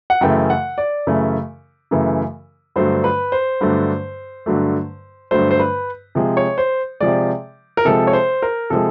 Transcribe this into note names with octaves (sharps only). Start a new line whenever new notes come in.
F#5
F#2 C#3 E3 A3 G5
F#5
D5
F#2 C#3 E3 A3
F#2 C#3 E3 A3
G2 D3 F#3 A3 C5
B4
C5
G2 D3 F#3 A3
G2 D3 F#3 A3
G2 D3 F#3 A3 C5
C5
B4
C3 F3 G#3
C#5
C5
C3 F3 G#3 D5
A#4
C3 F3 G#3 A4
C#5
C5
A#4
C3 F3 G#3 A4